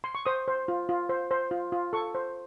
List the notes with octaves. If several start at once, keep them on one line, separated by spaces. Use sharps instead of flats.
C6
C#6
C5 D#6
C5
F4
F4
C5
C5
F4
F4
A4 C#6
C5